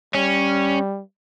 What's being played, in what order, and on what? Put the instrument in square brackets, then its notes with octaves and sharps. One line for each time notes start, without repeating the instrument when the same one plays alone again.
[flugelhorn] G3 [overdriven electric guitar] C#4